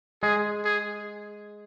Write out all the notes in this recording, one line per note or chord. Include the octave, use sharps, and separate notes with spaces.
G#3 G#4
G#4